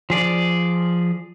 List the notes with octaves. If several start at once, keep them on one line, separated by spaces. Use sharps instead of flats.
F3 G#4 D5